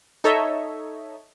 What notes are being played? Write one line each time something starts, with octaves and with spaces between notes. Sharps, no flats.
D#4 A4 C#5 D#5 E5